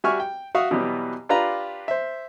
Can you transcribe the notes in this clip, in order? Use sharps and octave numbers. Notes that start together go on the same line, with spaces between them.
G3 F#4 E5 G#5 C#6 F6
G5
F#4 E5 F5 C#6 D#6
B2 E3 F#3 G3 B3
D4 F4 G4 B4 F5 A#5
C5 E5